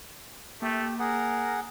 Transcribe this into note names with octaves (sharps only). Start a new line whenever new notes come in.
A3 A#3 G4
G#4 A#4 F#5